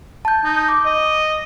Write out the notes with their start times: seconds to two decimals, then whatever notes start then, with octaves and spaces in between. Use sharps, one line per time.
0.25 A5 G6
0.44 D#4
0.69 D6
0.85 D#5